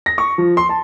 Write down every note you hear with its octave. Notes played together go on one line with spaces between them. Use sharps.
A#6
C#6
F3
C6
A5